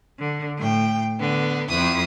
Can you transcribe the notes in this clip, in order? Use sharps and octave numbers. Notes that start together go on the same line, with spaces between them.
D3
A2 G5
D3 B3
F2 E4 D#6